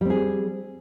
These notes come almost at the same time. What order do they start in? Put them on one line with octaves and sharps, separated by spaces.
G3 C4 G#4